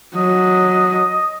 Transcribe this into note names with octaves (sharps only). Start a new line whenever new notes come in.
F#3 D#5